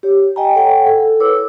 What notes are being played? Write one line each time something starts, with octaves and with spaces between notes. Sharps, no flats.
G4 C#5
D#5 G5 G#5 A#5
A4 C#5 F#5 G5
A4
E4 A#4 B4 C#5 D6 E6